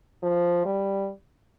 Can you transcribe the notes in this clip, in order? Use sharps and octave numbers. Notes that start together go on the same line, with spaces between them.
F3
G3